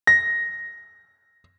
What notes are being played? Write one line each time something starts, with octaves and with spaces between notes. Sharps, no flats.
A#6